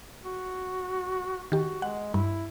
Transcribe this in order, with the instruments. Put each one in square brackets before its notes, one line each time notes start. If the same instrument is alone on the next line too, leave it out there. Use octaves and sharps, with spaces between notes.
[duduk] F#4
[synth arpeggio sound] D#3 G4 [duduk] F#4
[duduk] G#3 [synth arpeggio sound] F#5
[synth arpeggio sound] G2 [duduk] E4